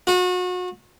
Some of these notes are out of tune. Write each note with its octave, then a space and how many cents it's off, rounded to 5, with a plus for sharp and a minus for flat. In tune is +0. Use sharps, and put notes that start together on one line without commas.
F#4 -35